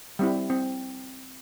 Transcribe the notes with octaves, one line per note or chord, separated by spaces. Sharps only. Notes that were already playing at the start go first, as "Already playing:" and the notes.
G3 C4 E4
C4